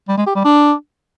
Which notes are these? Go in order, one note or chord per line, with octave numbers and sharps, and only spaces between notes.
G3
G#3
G4
G3
D4